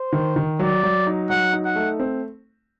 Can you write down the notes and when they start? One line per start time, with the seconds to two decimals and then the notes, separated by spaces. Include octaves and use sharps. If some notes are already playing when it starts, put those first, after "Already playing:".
Already playing: C5
0.13 D#3
0.36 D#3
0.59 F#3 D5
0.83 F#3
1.07 D#4
1.30 F#3 F#5
1.53 D#4
1.65 F#5
1.75 A3
2.00 C4